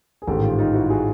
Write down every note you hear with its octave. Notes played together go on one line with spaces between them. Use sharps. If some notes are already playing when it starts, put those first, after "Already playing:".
G#4
A1 G#2 D#3 G4 A4
F4 G4
D#4 F4
E4 F#4
F#4 G#4